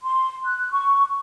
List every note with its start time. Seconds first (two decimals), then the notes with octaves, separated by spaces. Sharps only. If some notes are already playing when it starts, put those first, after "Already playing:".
0.02 C6
0.46 F#6
0.72 C#6